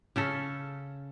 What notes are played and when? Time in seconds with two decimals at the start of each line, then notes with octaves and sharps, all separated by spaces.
0.16 C#3 C#4 A4